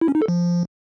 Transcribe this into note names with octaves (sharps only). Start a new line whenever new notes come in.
E4
C#4
D#4
A4
F3